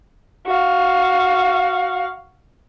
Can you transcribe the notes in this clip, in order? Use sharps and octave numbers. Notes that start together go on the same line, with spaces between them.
F#4 F5